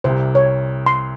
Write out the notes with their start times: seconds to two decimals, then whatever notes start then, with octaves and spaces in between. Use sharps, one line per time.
0.04 C2 C3 G3 C5
0.35 C#5
0.86 C6